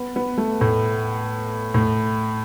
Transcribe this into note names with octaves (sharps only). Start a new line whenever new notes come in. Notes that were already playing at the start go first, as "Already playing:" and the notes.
Already playing: B3
B3
A3
A2
A2